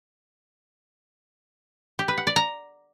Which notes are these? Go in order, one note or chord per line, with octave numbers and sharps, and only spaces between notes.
G4
B4
F#5
D5
A#5